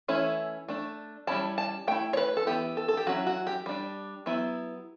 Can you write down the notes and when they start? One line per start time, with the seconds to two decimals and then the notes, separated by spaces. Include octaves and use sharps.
0.08 E3 A3 C#4 E4
0.68 A3 D4
1.27 G3 C#4 E4 A5
1.58 A5
1.87 A3 E4 G5
2.13 C#5
2.17 B4
2.37 A4
2.47 E3 B3 E4 G4
2.77 A4
2.88 A4
2.97 G4
3.07 F#3 C#4 E4 F#4
3.27 F#4
3.47 G4
3.66 G3 D4
4.26 F#3 B3 E4